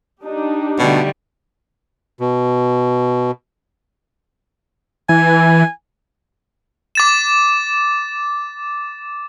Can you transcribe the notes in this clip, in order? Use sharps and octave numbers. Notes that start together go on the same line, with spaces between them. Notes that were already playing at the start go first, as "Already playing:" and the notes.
D4 D#4 G4
B2 D3 G3 A3
B2
E3 G#5
D6 A6 E7